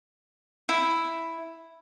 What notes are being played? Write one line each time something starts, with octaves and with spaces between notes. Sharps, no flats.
E4